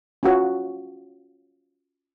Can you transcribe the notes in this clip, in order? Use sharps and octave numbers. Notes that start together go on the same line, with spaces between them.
C#4 F4 F#4 C#5